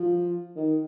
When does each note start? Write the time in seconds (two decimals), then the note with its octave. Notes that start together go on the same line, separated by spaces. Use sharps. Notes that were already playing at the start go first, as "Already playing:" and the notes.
Already playing: F3
0.56 D#3